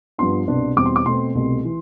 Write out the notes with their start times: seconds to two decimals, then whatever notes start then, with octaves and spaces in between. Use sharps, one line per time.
0.18 G2 F3 B3 D4 C6
0.47 C2 B2 B3 D4
0.76 E2 B2 G3 C4 D6
0.86 C6
0.96 D6
1.05 B2 A3 C4 C6
1.35 C2 B2 A3
1.65 E3